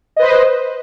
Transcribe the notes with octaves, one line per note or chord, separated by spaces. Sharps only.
B4 C5 D#5